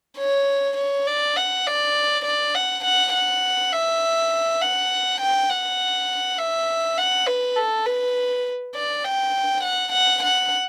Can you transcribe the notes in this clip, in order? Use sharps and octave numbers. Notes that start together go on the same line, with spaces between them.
C#5
C#5
D5
F#5
D5
D5
F#5
F#5
F#5
E5
F#5
G5
F#5
E5
F#5
B4
A4
B4
D5
G5
F#5
F#5
F#5